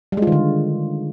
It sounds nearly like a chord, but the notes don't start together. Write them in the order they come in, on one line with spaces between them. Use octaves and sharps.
G3 G#3 F4 D#3 D3